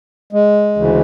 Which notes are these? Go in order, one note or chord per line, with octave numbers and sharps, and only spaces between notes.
G#3
D2 C#3 E3